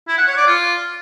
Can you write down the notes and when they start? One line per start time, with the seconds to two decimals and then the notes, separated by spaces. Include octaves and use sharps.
0.08 E4
0.18 F#5
0.27 C#5
0.37 D5
0.47 F4